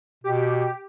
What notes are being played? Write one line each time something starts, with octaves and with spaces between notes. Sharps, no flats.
B2 G4